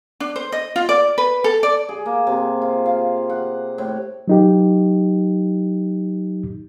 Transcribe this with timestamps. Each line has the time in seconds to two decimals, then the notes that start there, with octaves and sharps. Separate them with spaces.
0.20 D4
0.36 C5
0.52 D#5
0.76 F4
0.89 D5
1.18 B4
1.44 A4
1.63 D5
1.89 G#4
2.06 A#3
2.27 C3
2.62 F4
2.86 F5
3.30 F#5
3.78 A2
4.28 F#3 D#4 G4